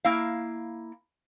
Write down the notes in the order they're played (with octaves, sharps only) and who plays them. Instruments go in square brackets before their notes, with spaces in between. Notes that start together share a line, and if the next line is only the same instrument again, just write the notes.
[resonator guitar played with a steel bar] A#3 E4 F5